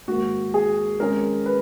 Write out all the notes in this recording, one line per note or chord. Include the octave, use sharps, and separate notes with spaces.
G#2 D#3 A#3 F#4
G#4
F2 D#3 G#3 C#4 A#4
B4